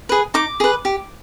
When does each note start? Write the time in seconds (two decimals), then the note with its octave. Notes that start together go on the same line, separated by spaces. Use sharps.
0.09 G#4 B4
0.34 D#4 D6
0.60 G#4 B4
0.85 G4